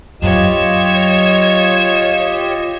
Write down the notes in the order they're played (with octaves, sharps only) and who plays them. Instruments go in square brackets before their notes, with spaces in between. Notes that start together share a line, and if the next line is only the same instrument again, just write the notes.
[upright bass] F#2 F#3 [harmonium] F4 G4 D#5 [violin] C#5 E7